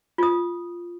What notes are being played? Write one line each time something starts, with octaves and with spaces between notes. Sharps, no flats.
F4 D#6